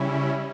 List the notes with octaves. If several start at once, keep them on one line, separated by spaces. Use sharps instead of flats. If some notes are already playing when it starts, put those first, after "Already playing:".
Already playing: C#3 G3 C#4 E4